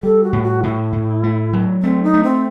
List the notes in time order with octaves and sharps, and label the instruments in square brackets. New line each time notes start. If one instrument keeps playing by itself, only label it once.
[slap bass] G3 [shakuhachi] A4
[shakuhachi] F#4
[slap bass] A2
[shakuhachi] F#4
[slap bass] A2 [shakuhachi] E4
[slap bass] A2
A3
F#3
[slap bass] A3 [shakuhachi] C4
[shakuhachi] D#4
[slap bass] A3
[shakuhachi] C4